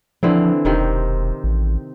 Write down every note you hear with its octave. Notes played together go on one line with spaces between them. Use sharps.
D3 E3 F3 C4
E1 C3 D#3 C4
A1